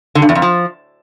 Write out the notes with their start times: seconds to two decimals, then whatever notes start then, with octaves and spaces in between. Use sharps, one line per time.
0.15 D3
0.22 G2
0.29 E2
0.35 F2
0.42 F3